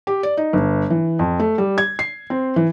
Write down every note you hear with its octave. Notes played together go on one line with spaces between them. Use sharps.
G4
D5
D#4
G1
E3
F2
A3
G3
G#6
C7
C4
E3